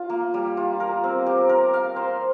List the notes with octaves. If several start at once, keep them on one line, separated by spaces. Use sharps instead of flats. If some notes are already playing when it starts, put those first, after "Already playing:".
Already playing: F4
A#3
G3
F4
A#4
C4
G4
A#4
F5
C5